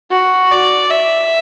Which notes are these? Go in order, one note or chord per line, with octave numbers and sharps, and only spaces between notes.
F#4
D5
E5